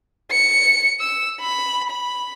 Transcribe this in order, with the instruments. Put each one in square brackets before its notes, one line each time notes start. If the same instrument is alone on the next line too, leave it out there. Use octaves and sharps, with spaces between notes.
[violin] C#7
E6
B5
B5